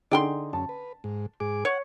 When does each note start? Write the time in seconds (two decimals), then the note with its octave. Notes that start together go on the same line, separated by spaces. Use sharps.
0.11 D3 D#4 G#4 D5 G5 C6
0.53 F#2 C#4 A5
0.69 B4
1.04 G#2
1.40 G#2 G#4 D6
1.65 C#5 F#5